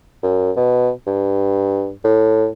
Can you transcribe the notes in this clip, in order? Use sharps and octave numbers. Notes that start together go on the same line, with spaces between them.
F#2
B2
G2
A2